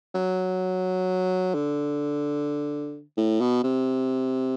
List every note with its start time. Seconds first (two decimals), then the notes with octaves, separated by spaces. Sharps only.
0.15 F#3
1.54 D3
3.17 A2
3.41 B2
3.63 C3